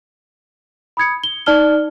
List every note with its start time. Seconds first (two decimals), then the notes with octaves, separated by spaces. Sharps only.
0.97 B5 D#6 G#6 C#7
1.24 G7
1.46 D#4 D5 A5 F6 G7